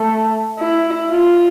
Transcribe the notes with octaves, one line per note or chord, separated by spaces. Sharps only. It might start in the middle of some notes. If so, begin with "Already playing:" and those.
Already playing: A3
E4
F4